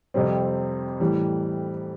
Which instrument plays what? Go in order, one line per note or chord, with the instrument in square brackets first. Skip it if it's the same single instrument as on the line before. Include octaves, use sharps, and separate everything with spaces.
[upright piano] F2 C3 G3 C4
A2 E3 G3